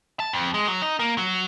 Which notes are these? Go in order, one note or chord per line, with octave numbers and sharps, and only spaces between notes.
A5
F2
G#3
F#3
D#4
A#3
F#3